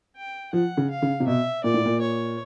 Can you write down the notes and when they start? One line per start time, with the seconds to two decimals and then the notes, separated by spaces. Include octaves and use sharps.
0.16 G5
0.53 F3 F#5
0.77 C#3
0.90 F5
1.02 C#3
1.20 C3
1.27 B2 E5
1.64 A#2 D5
1.74 A2
1.85 A#2
2.01 C#5